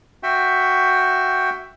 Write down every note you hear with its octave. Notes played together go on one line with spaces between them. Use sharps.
F#4 E5 G5